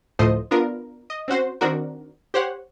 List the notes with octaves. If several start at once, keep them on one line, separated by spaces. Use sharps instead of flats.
D2 A2 F3 A3 C5 D#5
B3 D4 F4 A#4
D#5
C4 C#4 F#4 C5
D#3 C4 D4 F#4 A#4
G4 C5 C#5 F#5